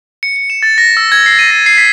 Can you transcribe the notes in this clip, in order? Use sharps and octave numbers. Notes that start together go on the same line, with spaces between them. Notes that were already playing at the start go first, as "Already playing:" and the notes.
C#7
C#7
E7
A6
A#6
E6
G#6
C7
D#7
A#6
C7
B6